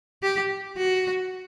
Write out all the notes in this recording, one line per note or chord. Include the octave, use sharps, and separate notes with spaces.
G4
F#4